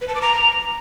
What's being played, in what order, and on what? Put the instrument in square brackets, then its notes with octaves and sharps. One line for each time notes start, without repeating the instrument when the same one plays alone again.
[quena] B4
A5
D6
A#5